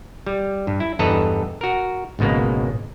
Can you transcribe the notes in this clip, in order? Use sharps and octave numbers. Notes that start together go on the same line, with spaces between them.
G3
G2
E4
E2 G2 A4 B4 D#5 A#5
F#4 A#4
G#1 C#2 B2 G#3 A#3